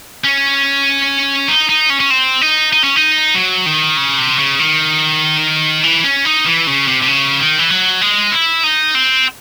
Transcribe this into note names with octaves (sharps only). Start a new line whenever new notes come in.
C#4
D#4
D#4
C#4
C#4
C4
D#4
D#4
C#4
D#4
F#3
D#3
C#3
C3
C#3
D#3
E3
C#4
D#4
E3
C#3
C3
C3
C#3
D#3
E3
F#3
G#3
E4
D#4
C4